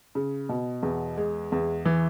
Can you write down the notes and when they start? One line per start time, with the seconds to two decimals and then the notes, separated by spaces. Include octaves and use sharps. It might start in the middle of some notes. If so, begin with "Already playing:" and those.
0.15 C#3
0.49 B2
0.83 E2
1.17 G#3
1.52 E2
1.85 E3